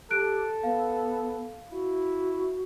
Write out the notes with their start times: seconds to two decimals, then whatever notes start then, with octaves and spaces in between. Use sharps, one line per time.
0.11 G4 A4 F#6 D7
0.63 B3 F5
1.72 E4 F#4